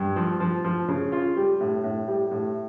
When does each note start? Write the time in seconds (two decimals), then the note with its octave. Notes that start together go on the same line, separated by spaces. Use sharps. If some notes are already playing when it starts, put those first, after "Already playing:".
Already playing: G2
0.16 F3
0.40 F3
0.64 F3
0.88 C#3
1.12 F4
1.36 G3
1.60 A2
1.84 A2
2.08 G3
2.31 A2